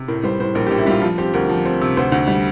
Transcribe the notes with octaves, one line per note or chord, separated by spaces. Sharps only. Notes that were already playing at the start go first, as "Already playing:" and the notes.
Already playing: C3
A2 A#4
G3 C5
A2 C5
A#1 A#4
G4
A#1
E4
G3 F4
F3 F4
C4 G4
D2 A#4
F3
C4
C3
D2 C5
D2
G3